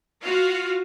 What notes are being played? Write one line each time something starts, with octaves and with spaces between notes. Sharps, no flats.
F4 F#4 F5